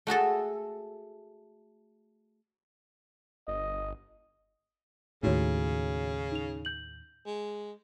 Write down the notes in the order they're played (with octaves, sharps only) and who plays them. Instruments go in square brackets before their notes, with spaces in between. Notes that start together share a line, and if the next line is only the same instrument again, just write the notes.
[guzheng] A3 F#4 G#4 A4
[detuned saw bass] G1 [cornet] D#5
[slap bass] D#2 A2 [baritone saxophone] C#3 [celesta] D#4 F#4 C#5
[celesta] D#4 F7
G6 F#7
[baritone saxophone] G#3